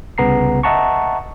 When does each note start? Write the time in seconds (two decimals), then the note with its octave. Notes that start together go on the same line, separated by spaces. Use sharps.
0.18 C2 C#3 B3 A#5 C7
0.63 D#5 E5 F#5 A5 A#5 C#6